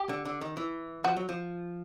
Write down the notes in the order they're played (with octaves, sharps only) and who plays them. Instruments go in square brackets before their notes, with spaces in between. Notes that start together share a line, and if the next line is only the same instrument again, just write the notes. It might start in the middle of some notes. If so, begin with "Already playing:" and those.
Already playing: [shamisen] G4
[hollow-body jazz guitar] D3
D3
D#3
E3
[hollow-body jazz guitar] F3 [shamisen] F#4
[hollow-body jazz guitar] F#3
F3